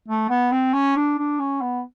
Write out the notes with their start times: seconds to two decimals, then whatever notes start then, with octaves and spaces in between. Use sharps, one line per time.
0.08 A3
0.29 B3
0.52 C4
0.73 C#4
0.96 D4
1.18 D4
1.39 C#4
1.61 B3